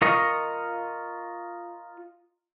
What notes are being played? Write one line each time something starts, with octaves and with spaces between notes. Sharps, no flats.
F4 A#4 D#5 C#6